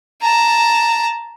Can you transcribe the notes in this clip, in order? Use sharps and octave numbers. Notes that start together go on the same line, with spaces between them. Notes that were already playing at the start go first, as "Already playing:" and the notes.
A5 A#5